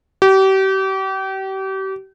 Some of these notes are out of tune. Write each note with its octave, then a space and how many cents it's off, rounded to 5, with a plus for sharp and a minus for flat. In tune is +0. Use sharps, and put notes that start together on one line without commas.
G4 -35